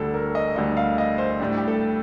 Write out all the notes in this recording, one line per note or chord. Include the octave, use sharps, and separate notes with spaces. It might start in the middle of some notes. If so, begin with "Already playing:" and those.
Already playing: D2 D3 G3 A4
A#4
D#5
D2 D3 G3 D#5
F5
D#5
C5
A2 G3 D4 G4
G4
A4